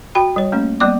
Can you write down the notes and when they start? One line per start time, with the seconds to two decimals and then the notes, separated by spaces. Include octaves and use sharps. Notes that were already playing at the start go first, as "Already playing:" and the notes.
0.15 F#4 G5 B5
0.36 G3 C#5
0.52 A3 A#3 C#4
0.80 G3 A#3 B3 D5 D6